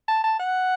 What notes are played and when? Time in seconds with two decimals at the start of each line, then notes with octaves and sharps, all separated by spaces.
0.08 A5
0.24 A5
0.39 F#5